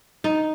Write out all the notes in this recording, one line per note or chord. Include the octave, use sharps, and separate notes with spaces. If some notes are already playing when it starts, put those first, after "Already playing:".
D#4